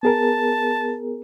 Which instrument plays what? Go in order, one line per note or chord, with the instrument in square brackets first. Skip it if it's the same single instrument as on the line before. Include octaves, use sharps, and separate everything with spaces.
[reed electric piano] B3 G#4 A#4 [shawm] A5